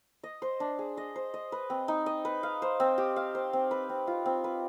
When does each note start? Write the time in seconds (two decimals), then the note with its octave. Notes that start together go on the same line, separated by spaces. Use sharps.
0.23 D#5
0.42 C5
0.60 D4
0.79 G#4
0.97 D#5
1.16 C5
1.34 D#5
1.52 B4
1.70 C4
1.88 D#4
2.06 D#5
2.25 B4
2.43 F5
2.62 C5
2.80 C4
2.98 G4
3.16 F5
3.35 C5
3.53 C4
3.71 B4
3.89 C4
4.07 F4
4.26 C4
4.44 B4